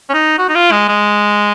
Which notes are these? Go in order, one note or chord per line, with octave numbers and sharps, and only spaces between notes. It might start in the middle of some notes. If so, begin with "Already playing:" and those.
C#4
D#4
F#4
D#4
F4
G#3
G#3